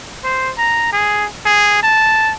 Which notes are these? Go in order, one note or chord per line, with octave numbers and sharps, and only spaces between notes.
C5
A#5
G#4
G#4
A5